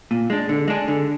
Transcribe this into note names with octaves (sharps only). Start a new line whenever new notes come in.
A#2
G#3 D4
D3
G#3 D4 G#4
D3